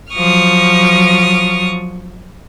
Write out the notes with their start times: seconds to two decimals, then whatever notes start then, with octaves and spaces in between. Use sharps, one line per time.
0.13 F3 F#3 C#6 D#6 F6